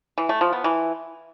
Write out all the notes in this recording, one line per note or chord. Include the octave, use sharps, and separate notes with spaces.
E3
A3
F3
B3
E3